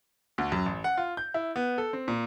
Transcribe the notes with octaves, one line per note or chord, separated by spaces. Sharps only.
D2
F#2
A1
F#5
F4
G6
E4
B3
A4
C4
A#2